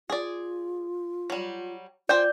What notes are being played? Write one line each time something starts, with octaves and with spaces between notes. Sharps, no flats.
F4 G#4 D5
F#3 G3
F4 C5 D5 G5 G#5 G6